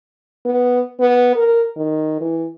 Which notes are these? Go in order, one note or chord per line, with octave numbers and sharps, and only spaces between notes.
B3
B3
A#4
D#3
E3